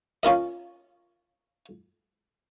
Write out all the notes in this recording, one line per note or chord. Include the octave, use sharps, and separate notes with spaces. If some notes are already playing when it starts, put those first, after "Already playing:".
C#4 F4 A#4 D#5